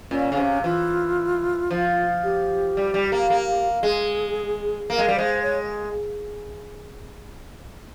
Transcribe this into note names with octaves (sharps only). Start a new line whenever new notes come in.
A#2 C#4
C#3
C3
E3 F4
F3
G4
G3
G3
A#3
A#3
G#3 G#4
A#3 A#4
G#3
G3
G#3 C5
C#5